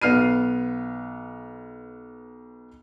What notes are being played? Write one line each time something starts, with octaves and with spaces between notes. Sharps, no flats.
B1 B3 F6 C7 D#7